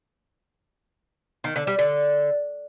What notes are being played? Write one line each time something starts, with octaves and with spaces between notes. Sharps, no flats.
D#3
D3
G3
D3